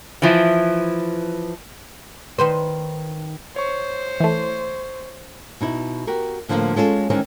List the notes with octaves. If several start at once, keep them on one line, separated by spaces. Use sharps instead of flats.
E3 F3 E4
D#3 B4 C5
C5 C#5 C#6
E3 A3
B2 D#4 E4
F#4 G4 A#4
A2 D3 F3 G#3 A#3 F4
G#3 C#4 F4 A4
D#3 E3 G#3 C4 C#4 D#4